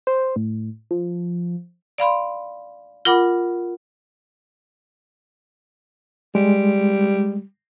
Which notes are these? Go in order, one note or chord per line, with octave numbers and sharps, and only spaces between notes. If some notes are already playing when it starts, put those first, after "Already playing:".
C5
A2
F3
D5 F5 B5 C6
F4 A#4 F#5 B5 D6
G3 G#3